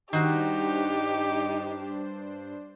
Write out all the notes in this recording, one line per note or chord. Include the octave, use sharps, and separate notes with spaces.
G2 D#3 D4 D#4 F#4 G4 C5